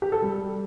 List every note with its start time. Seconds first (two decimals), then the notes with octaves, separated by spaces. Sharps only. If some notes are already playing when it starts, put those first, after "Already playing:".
0.02 G4
0.12 A4
0.22 G3